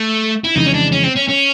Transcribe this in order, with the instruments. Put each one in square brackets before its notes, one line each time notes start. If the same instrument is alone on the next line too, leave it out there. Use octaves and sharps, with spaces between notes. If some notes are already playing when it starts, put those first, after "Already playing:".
Already playing: [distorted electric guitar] A3
E4
[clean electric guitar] F2 C#3 E3 G#3 [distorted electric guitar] D#4
[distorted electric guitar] C#4
D4
C#4
C4
C#4
C#4